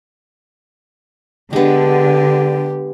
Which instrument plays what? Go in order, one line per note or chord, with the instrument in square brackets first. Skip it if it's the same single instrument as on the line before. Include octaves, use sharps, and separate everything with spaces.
[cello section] D3 [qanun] G#3 B3 [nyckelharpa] G4